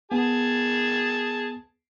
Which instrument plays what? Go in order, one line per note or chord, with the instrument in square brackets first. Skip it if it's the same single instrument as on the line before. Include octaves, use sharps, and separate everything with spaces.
[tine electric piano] B3 [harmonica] G#4 A5